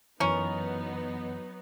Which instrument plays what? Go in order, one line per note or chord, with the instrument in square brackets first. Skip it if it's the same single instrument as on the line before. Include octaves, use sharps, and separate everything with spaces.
[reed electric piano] F#2 E3 [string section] F#3 B3 D#4 [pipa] C#4 A#4